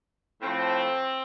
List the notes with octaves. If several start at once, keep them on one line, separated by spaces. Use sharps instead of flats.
A2 F3 A3 C4